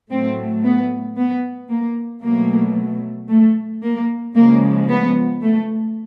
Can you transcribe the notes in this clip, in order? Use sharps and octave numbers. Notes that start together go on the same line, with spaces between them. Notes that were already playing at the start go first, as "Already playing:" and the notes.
A2 F#3 A3 C4
B3
B3
A#3
B2 F#3 A3 A#3
A3
A#3
C#3 F3 G#3 A#3
B3
A3